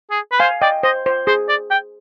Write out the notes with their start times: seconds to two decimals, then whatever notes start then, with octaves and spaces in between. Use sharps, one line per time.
0.11 G#4
0.32 B4
0.40 C5 F5 G#5
0.62 D5 D#5 G5
0.83 C5 D#5
1.06 C5
1.27 G#4 C5
1.49 D5
1.71 G5